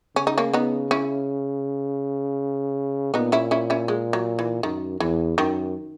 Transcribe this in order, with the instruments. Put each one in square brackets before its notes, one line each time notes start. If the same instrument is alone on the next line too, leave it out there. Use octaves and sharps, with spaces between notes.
[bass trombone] C#3 [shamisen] C#4
[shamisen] D#4
A#3 C#4
B3 D#4
C#4 E4
[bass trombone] A#2 [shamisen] B3 D#4
[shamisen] C#4 E4
C#4 E4
C#4 E4
G#3
F#3
E3
[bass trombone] F#2 [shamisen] D#3
[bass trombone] E2 [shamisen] E3
[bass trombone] F#2 [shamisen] D#3